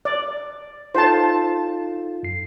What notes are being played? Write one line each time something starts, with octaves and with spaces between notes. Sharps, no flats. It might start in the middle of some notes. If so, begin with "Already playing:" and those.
D5
D#4 F4 A4 C5 A5
F#2 C7